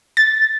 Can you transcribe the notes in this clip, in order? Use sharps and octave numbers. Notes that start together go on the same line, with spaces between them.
A6